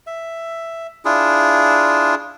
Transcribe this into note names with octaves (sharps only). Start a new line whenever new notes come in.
E5
D4 E4 F4 G#4